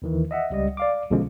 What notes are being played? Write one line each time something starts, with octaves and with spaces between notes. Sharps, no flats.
D#2 D#3 E3
D#5 E5 F#5
C#2 G3 D#5
D5 F5 D6
B1 B2 D3 F3 G#3 C#4